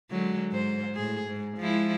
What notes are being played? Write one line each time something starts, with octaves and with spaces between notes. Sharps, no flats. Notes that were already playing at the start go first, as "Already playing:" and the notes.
D3 F#3 G#3
G#2 C5
A2 G#4
G#2
F3 G#3 E4